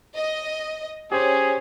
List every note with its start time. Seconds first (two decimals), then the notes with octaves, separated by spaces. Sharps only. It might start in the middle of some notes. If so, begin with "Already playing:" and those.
0.16 D#5
1.12 C#4 G4 G#4 C5